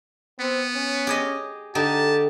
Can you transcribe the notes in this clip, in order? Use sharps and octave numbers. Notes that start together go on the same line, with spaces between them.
B3 C4
C#4
G4 G#4 D#5
D3 D#4 G4 A5